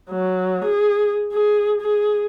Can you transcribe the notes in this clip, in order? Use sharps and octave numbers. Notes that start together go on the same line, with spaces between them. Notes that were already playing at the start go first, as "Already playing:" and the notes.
F#3
G#4
G#4
G#4